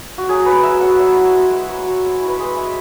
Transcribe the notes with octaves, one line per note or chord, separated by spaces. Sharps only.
F#4
F#3 G#4
F#3 B4
F#3 E5
F#3 F#5
F#3 E5
E4
G#3
G#3
F#3 C#5
F#3
G#3
E4
B4
G#3 G#4
G#3 E5